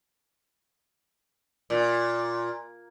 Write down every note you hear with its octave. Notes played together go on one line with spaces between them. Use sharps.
A#2